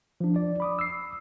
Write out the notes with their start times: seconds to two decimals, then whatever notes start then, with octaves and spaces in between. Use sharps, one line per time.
0.20 F3 D4
0.36 D5
0.60 B5 D6 D#6
0.79 E6 C7